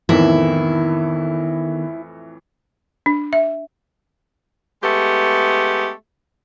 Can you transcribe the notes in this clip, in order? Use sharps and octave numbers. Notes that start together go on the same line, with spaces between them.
F2 A2 D#3 E3 B3 E4
D4
E5
G#3 A3 B3 G4